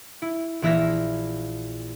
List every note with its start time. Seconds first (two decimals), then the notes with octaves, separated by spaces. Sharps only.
0.22 E4
0.62 A#1 E3 E4 E5 F6 A#6